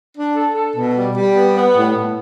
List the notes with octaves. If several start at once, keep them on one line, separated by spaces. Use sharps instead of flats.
D4
A4
A4
B2
G3
G3
B3
B3
A2
A2